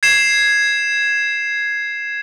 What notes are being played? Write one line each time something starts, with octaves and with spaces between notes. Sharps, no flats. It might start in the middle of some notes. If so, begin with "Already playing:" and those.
G#6 C7 E7